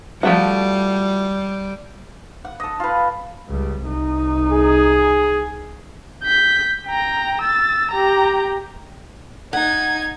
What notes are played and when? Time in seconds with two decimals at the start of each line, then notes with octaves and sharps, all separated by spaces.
0.23 F3 G3 A3 F#4
2.45 F#5
2.60 A4 D#5
2.80 F4 B4
3.49 C#2 G3
3.82 C2 D#4
4.52 G#4
6.23 G6 B6
6.87 G5 A#5
7.42 E6 A6
7.91 G4 A#5
9.53 D#4 F#5 G#6